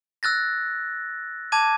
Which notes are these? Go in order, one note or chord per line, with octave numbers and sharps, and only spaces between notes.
E6 F#6 A6 A#6
A5 D6 G#6 D#7